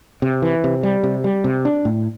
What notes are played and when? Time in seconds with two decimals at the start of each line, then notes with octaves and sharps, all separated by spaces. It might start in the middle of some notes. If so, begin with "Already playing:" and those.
0.22 C3
0.42 E3
0.64 C3
0.83 G3
1.04 C3
1.24 G3
1.44 C3
1.65 D4
1.85 A2